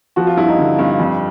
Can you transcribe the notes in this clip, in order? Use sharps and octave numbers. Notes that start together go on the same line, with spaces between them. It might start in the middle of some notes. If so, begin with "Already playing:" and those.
F3 F#4
F4
G2 E4
D#4
D3
G2
F2